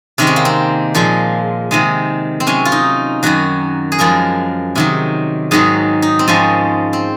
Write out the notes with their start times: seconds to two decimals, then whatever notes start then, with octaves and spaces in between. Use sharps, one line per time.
0.18 C3 D#3 G#3 C#4
0.27 C4
0.36 A#3
0.45 C4
0.95 A#2 F3 G#3
1.71 C3 D#3 G#3
2.40 C4
2.47 C3 F#3 C#4
2.65 F4
2.72 D#4
3.23 F#2 D#3 F#3 F#4
3.92 G#4
3.99 F#2 F3 G#3 A#4
4.75 C3 D#3 F#3
5.51 G#2 D#3 F#3 G#4
6.02 D#4
6.19 C4
6.28 G#2 F3 G#3 C#4
6.93 C4